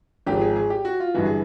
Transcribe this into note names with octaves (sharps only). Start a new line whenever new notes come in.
G#1 G#2 F3 G4
G#4
G#4
G4
F#4
F4
G1 G2 E3 F#4
G#4